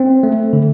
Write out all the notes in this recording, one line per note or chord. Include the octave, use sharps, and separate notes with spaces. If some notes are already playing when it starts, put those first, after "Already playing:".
Already playing: C4
A3
D3